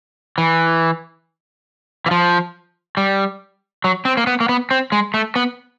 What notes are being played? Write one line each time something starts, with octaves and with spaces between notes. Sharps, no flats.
E3
E3
F3
G3
F#3
C4
A#3
B3
A#3
B3
C4
G#3
A3
B3